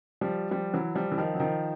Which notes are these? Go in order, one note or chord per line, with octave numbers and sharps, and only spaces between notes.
F3 G3
F3 G3
E3 F#3
F3 G3
E3
D#3 F3
F#3
D#3 F3